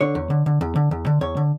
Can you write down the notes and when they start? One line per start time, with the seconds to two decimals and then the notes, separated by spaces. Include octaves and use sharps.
0.01 D3 C#5
0.15 E2
0.30 D3
0.46 D3
0.61 E2
0.76 D3
0.91 E2
1.06 D3
1.21 E2 C#5
1.37 D3